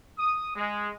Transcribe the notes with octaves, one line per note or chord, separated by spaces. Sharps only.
D#6
G#3